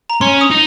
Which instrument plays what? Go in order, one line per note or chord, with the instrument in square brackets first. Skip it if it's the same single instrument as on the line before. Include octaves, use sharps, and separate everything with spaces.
[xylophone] A#5
[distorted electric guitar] C#4 [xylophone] C6
[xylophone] D#6
[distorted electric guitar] D#4